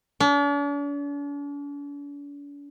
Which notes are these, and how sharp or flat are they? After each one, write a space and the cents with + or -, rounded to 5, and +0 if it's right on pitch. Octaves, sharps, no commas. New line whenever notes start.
D4 -45